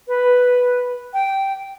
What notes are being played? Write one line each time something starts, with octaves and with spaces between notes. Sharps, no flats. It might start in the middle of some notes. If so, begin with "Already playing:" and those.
B4
G5